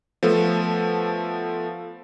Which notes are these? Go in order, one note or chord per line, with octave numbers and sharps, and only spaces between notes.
F3 A3 B3 A4